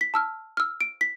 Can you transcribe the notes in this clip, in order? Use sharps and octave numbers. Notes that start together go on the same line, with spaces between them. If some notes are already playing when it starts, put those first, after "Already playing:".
B6
A5 E6 F6
E6 F6
D7
B6